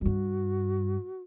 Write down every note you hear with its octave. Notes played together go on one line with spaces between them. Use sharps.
G2 G3 F#4